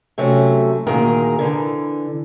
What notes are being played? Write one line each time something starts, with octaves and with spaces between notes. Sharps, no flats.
C3 F#3 A3 C#4
D2 A#2 D#3 G#4 A#4
D3 E3